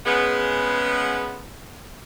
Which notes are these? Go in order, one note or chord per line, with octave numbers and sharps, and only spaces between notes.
C#3 G#3 B3